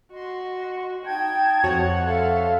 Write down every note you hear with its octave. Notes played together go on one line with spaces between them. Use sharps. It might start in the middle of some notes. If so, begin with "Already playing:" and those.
F#4 D#5 C6
D#4 G5 A5 G#6
F2 F#4 C#5 F#5
A4 E5 F5 C6